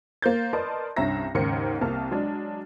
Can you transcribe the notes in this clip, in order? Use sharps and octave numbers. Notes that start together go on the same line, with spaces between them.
A#3 C5 G6 A6
A#4 B4 D5 D#5 A5 C6
C2 G2 C#4 E5 A#5 A#6
D#2 G#2 C#3 A#4 C5 C#7
C2 C3 A#3 A5 F6
F#3 G#3 D4